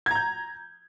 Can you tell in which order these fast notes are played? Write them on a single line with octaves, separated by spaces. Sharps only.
G#6 A#5 G6